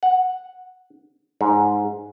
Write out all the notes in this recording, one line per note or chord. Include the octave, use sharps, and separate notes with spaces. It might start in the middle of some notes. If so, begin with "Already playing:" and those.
F#5
G#2